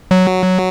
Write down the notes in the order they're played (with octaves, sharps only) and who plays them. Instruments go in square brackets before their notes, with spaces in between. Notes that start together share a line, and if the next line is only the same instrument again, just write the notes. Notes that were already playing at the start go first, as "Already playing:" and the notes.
[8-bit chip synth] F#3